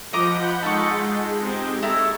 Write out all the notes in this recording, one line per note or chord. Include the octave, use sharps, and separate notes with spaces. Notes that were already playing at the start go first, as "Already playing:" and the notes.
F3 D#5 F#5 A#5 B5 D6 G6
G#3 D#4 F4 A4 C#6
C4 D#4 G4
G#3 E4 A4 A#5 C#6